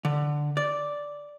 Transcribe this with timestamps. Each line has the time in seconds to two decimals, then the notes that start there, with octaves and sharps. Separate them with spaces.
0.05 D3
0.57 D5